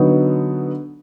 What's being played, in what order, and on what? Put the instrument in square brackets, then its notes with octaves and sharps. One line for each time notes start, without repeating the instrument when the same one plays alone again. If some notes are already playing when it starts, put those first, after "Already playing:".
Already playing: [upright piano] D3 F#3 B3 D#4